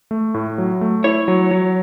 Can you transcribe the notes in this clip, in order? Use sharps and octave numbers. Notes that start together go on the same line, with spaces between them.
A3
A2
F#3
A3
E4 C#5
F#3
F#3